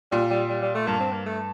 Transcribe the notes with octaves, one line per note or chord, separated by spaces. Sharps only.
A#2 G3
G3
G3
G3
A3
G2 A#3
C4
A#3
A3